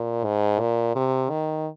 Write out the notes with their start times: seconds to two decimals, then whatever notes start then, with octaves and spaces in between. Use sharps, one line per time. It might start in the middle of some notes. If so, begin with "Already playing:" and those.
Already playing: A#2
0.24 G#2
0.60 A#2
0.95 C3
1.30 D#3